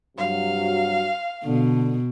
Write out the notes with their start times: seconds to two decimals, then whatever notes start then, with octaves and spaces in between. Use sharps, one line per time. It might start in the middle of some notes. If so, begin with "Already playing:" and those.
0.18 G2 C3 F#3 F5
1.45 B2 D3